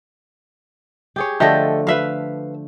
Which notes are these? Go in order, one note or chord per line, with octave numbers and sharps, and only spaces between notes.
G4 G#4 C#5
D3 F3 A3 G4 A4 D#5
B4 E5 F5